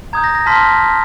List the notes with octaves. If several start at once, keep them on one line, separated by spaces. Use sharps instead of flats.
A#5 D#6 G6 G#6
A#6
A#6
A5 C6 F6 B6